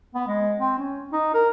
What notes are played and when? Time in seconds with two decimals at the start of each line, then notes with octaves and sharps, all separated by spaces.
0.15 B3
0.27 G#3
0.60 C4
0.78 C#4
1.12 D#4
1.34 A#4